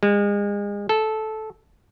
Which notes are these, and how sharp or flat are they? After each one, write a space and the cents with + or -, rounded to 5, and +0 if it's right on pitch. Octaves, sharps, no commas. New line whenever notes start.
G#3 -35
A4 -10